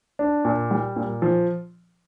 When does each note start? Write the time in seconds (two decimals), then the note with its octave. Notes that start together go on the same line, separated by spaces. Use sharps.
0.19 D4
0.45 A#2
0.71 G3
0.96 A#2
1.22 F3